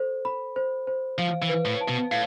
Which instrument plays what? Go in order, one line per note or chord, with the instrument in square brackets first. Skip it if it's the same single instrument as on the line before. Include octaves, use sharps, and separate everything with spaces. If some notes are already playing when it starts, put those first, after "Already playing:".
Already playing: [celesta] A4 C5
B5
C5
C5
[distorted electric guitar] F3 [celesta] F5
[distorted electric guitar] E3
[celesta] B4
[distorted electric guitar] A2
[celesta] A5
[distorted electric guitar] B2
[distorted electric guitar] A2 [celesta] F5